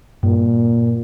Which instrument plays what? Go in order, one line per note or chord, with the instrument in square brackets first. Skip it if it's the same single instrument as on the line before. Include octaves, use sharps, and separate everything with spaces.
[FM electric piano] G2 [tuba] A#2